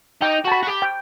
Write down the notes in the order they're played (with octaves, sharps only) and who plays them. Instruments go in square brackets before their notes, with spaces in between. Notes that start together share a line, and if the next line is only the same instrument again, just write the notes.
[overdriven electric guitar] D#4 [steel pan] G5
[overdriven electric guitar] F#4 [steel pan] A5
[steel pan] B5
[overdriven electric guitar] F#4
G4
[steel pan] G5